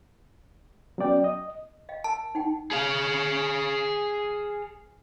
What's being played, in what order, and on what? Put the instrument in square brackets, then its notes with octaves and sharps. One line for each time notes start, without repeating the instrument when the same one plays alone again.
[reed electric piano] F#3 B3 C#4 D5 G5
D#5
[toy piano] D#5 F5 G5
[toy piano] A#4 [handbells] A5
[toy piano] D#4 F#5 G5
[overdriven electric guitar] G#4 F5